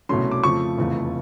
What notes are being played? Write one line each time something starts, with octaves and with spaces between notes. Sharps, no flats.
C2 B2 F#3 A3 C#4 C6
D6
F2 C#3 F3 A3 C#6
F1 E2 C#3 F3 A3